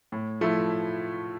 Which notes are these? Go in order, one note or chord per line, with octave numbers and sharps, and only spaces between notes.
A2
F3 A3 E4